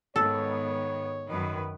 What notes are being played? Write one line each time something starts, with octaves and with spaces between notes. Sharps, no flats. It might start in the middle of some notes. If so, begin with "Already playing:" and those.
G#2 D#3 B3 A4 C#5
F#2 D#3 B4